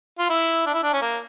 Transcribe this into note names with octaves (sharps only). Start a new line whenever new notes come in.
F4
E4
D4
E4
D4
C#4
A#3